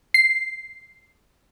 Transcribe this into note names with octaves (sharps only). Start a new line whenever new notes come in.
C7